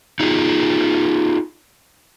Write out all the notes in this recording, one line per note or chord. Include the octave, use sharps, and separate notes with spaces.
D#4 F4 G#4